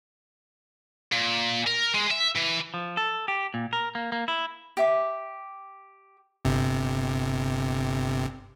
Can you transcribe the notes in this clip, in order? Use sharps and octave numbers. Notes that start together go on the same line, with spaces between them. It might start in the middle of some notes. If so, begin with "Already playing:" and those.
A#2
A#4
G#3
E5
E3
F3
A4
G4
A#2
A#4
A#3
A#3
E4
G4 E5 D6
G1 C3